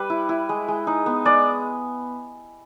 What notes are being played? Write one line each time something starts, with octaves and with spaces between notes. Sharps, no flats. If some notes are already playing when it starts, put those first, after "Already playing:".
Already playing: G3 B4
E4
E4
G#3
G#3
D#4
B3
G#3 D5